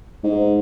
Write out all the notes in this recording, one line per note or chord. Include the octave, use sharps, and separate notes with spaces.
G#2